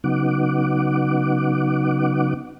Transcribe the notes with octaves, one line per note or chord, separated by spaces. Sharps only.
C#3 F#3 B3 D#4 F#5 D6